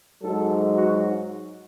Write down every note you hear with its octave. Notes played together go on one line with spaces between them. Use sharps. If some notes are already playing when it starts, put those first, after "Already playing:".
G#2 F#3 A4
F#4